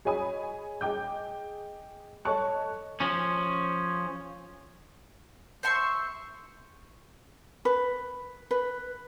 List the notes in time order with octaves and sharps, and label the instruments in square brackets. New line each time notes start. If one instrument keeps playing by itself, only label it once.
[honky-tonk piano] G#4 C#5 D#5 G#5 B5 D#6
G#4 D#5 G5 D6 G6
A4 C#5 D#5 A5 C#6 F#6
[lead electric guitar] F3 C#4
[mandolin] C5 E5 C6 C#6
[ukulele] B4
B4